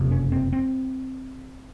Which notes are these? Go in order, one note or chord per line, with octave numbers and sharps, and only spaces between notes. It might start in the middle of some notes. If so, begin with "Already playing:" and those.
Already playing: F#1 F2 C3
C#4
C4
C4